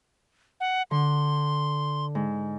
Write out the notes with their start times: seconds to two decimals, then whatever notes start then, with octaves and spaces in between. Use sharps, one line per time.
0.60 F#5
0.91 D3 C6
2.15 G#2